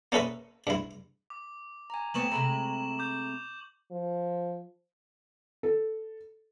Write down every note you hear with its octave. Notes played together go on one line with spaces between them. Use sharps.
A#3 C#4 A4 B4 E5 D#6
G2 E4
D6
G#5 A#5
G3 A3 B3 C#6 E7 F#7
C3 G#3 A3 A#5 B5
D6 G6
F3
A4